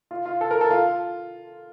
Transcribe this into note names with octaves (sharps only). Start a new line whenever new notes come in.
F4
F4
A4
A#4
A4
F4